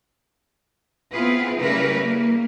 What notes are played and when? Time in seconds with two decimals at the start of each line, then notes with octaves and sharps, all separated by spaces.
1.12 B3 C4 E4 F4 G#4 B4
1.58 C#3 G3 A3 E4 A#4 B4
2.02 A#3